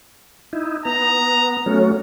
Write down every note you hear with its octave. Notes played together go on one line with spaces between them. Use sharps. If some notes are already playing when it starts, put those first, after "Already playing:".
D#4 E4
B3 A#5
F#3 A3 C#4